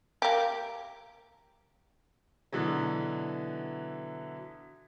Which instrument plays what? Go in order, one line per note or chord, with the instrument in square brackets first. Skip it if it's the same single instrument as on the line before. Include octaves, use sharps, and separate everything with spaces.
[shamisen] A#3 G4
[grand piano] B2 D3 E3 F#3